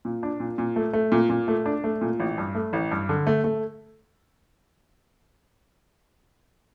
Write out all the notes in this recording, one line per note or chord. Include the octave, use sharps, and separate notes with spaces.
A#2
D4
A#2
A#2
A3
A3
A#2
A#2
A3
D4
A3
A#2
A1
G2
A3
A1
G2
D3
A3
A3